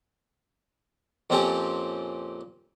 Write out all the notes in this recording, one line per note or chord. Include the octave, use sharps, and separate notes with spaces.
F2 A#2 C4 C#4 G4 A5